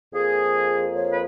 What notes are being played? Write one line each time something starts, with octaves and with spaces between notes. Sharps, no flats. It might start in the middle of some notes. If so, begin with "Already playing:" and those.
F2 F3 A#3 G#4
C#5
B4